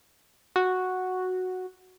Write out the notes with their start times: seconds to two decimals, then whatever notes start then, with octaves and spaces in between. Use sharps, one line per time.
0.56 F#4